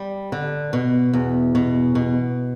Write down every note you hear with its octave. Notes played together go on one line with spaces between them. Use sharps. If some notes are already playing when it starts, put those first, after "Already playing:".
Already playing: G3
D3
B2
E2
B2
B2